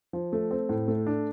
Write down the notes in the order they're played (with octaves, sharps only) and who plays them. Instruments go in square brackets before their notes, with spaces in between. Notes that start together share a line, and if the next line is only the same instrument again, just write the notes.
[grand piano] F3
A3
C4
A2
A3
D4